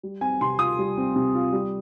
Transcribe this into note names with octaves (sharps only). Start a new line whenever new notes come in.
G3
C4 G#5
C3 C6
F4 D#6
G3
C4
C3
F4
G3